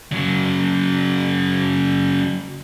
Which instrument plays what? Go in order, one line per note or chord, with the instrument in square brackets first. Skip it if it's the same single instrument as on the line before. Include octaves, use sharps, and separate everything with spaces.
[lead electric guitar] C#3 F#3